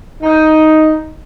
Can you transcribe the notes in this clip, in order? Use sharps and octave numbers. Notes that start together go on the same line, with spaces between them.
D#4